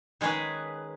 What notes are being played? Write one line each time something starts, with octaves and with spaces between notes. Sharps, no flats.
D#3 G#3 C#4 G#4 B4